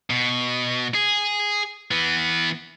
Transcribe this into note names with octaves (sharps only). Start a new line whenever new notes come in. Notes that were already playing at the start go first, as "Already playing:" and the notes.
B2
G#4
E3 B3